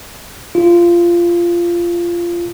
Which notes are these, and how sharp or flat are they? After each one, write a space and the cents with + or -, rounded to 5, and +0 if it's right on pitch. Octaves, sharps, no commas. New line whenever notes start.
F4 -15